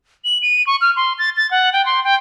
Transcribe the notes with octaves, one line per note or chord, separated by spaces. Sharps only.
F#7
D#7
C#6
F6
C6
A6
A6
F#5
G5
C6
G5